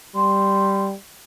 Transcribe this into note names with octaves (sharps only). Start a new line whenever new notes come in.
G3 C6